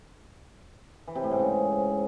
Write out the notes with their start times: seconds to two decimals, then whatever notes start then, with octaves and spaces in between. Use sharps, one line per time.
1.07 E3
1.15 C3
1.23 A2
1.31 G#2
1.39 C#3